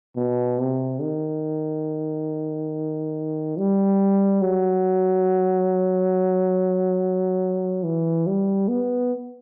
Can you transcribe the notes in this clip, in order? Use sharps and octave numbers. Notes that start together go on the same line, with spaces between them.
B2
C3
D#3
G3
F#3
E3
G3
B3